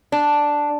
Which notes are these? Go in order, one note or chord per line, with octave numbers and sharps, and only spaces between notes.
D4